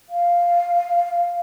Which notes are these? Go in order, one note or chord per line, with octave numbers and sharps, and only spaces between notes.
F5